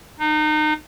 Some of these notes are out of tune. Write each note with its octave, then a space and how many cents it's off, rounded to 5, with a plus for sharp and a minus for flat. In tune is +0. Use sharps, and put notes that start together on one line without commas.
D#4 -30